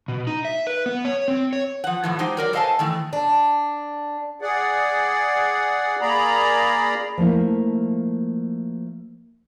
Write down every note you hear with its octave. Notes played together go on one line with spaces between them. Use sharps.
B2
D#4
E5
B4
B3
C#5
C4
C#5
F3 F#5
A2 E3 F3
G#3 D#4 G4 C5
F#3 A#4 D5
A4 C5 D#5 F5 G#5 A5
D#3 E3 A3
D4
G#4 D5 F#5
A#3 G#4 D5 A#5 B5
F3 A3 A#3 E4